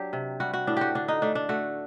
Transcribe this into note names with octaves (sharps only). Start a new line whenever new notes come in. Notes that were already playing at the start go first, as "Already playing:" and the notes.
Already playing: F#3 D4 G4
C3
G3 F#4
F#4
A2 D4
F#4 G4
D3 D4
D#4
A3 D4
D4
A3 F#4